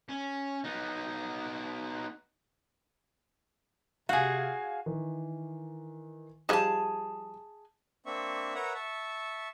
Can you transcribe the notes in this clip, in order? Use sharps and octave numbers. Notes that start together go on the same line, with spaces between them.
C#4
B3 D#4
C3 F#4 G#4 F5 G#5
D#3 E3
F3 G3 D#4 G#4 A5 E7
A#3 C4 D4 E5 C#6
A#4 B4 C#5 E5 F#5 A#5
E5 A5 C#6